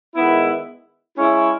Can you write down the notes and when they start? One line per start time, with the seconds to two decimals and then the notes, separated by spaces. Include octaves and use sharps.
0.15 D#3 G#3 B3 E4
1.18 G#3 C#4 E4